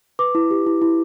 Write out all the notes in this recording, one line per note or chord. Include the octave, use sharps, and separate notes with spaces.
B4 D6
E4
G4
E4
E4